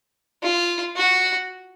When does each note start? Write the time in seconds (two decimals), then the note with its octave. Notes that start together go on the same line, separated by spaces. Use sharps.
0.43 F4
0.97 F#4